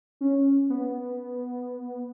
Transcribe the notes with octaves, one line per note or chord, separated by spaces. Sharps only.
C#4
B3